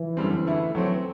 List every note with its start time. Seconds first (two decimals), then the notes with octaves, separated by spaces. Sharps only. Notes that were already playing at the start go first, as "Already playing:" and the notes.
Already playing: E3
0.17 F#2 D3 G3 C4
0.46 D3 A3 E4
0.75 E3 F#3 A3 C4